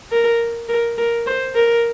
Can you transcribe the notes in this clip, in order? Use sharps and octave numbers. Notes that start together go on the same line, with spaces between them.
A#4
A#4
A#4
C5
A#4